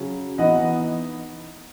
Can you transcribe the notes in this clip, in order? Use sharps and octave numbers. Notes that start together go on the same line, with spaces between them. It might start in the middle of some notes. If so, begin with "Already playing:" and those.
Already playing: C#3 F#3 C#4
E3 B3 D#4 D#5 F#5